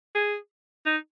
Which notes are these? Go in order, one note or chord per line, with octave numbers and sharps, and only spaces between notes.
G#4
D#4